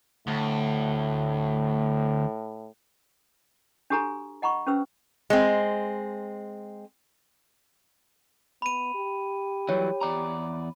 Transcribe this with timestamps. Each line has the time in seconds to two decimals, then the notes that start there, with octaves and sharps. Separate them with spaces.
0.27 D2 A2
3.90 D4 F#4 G4 A4 G#5 A#5
4.42 D#5 F#5 A#5 B5 C#6
4.67 C#4 G4 B4 C5 E6
5.30 G#3 C4
8.62 B3 B5 D#7
8.94 G4
9.69 E3 F#3 G3 C#5
10.01 E2 D5 A#5